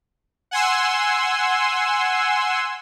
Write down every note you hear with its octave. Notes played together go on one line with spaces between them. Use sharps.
F#5 G#5 C6 E6